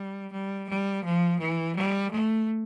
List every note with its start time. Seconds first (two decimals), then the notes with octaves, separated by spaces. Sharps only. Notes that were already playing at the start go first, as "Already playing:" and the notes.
Already playing: G3
0.33 G3
0.68 G3
1.03 F3
1.39 E3
1.75 G3
2.10 A3